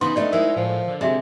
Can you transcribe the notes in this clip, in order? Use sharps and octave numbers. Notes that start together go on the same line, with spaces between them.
C#3 E3 B3 D#4 C6
G#3 A3 D4 D5 D#5
D2 G#3 E4 A#4
A2 F3
D3
C3 G#3 F#4 E5 A#5